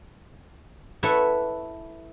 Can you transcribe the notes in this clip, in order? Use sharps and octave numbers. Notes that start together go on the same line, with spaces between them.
E4 A4 B4 C#5 E5 F#5